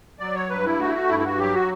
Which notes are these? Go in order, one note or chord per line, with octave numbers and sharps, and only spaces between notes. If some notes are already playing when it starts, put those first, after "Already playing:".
F#3 D5
C#5
G2 B4
E4
A3 F#4
E4
F#4
G2 E4
E4
F#4
F#3 G4
F#4